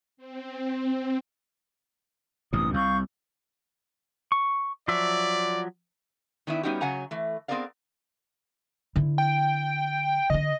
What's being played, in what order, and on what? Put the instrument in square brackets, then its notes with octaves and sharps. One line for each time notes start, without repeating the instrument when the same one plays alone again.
[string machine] C4
[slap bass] A1 G2 C3 [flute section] D#6
[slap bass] C2 [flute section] F5 C#6 G6
[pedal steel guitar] C#6
[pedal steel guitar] F3 F#3 E5 [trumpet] D5
[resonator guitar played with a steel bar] D#3 B3 D4 E4
G3 B3 C#4 D#4 F#4 G4
C#3 F#3 F#5 G#5 A#5
E3 A3
B3 C4 G#4 A#4 D5 F5
[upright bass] D3 E4
[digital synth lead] G5
[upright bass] D3 D4 [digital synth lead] D#5